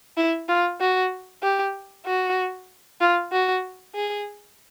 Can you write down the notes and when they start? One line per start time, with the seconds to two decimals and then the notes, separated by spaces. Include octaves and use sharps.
0.17 E4
0.49 F4
0.80 F#4
1.43 G4
2.06 F#4
3.01 F4
3.32 F#4
3.95 G#4